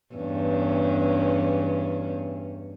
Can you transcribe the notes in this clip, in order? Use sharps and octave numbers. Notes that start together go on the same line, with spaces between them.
E2 G2 C#4